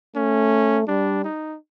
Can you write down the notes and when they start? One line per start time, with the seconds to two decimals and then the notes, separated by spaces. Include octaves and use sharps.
0.16 A3 C#4
0.88 G3 D4
1.24 D#4